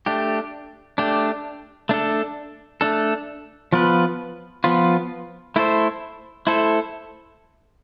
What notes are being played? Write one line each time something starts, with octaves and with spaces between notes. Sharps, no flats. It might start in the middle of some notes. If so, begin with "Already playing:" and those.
A3 D4 G4
A3 D4 G4
A3 D4 A4
A3 D4 A4
F3 B3 F4 B4
F3 B3 F4 B4
A3 E4 A4 C5
A3 E4 A4 C5